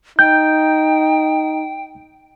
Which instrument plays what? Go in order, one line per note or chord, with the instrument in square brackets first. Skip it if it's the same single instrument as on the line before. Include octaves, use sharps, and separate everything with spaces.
[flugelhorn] D#4 [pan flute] G5 [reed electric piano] G6